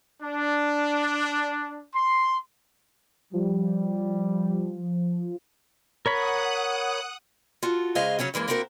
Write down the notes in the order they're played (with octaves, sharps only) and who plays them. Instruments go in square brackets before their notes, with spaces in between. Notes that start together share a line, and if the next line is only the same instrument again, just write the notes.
[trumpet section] D4
C6
[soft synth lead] F3 [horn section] G3
[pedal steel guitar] A#4 C#5 B5 [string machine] F#5 D#6 F#6
[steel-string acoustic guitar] F4 F#4 A4
C#3 G#3 G#4 C5 D#5 F5
C#3 F#3 C#4 F#4
F#2 E3 G#3 A#3
A#3 C4 E4 F#4 G#4 A#4